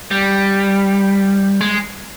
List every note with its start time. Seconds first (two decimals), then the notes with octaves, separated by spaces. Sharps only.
0.11 G3
1.61 G#3